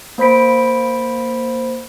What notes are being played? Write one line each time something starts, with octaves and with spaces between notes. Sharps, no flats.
A#3 C5 B5 B6 D7